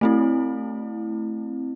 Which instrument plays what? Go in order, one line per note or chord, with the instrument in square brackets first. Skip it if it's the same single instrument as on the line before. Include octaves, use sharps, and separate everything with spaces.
[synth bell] A3 C4 E4